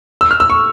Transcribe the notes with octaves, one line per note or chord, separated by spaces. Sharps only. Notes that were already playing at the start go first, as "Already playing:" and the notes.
E6
F6
E6
C#6